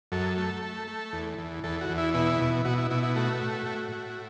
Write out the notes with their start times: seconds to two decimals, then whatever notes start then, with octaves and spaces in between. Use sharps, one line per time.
0.12 F#2 A4
0.38 A3
0.62 A3
0.88 A3
1.13 E2
1.38 E2
1.64 E2 A4
1.81 F#4
1.89 E2
1.98 E4
2.14 B2 E4
2.39 B2
2.65 B2 F#4
2.78 E4
2.91 B2 E4
3.03 E4
3.16 A3 F#4
3.41 A2
3.66 A2
3.92 A2